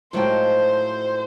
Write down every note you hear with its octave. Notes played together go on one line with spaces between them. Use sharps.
A2 F3 F#3 G#3 D#4 C5 G5